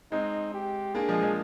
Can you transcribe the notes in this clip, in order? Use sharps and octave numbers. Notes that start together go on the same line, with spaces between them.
G#3 C4 D#4
G4
A#3 D4 G#4
F3 G#3
F3 G#3